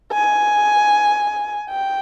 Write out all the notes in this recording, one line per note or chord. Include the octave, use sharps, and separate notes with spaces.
G#5
G5